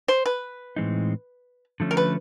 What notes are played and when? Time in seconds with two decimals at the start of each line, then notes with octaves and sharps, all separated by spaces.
0.08 C5
0.26 B4
0.76 A2 E3 G#3 C4 D#4
1.80 D3 F3 A3 C#4
1.91 A#4
1.97 B4